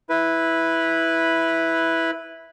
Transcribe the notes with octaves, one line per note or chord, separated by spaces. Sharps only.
E4 B4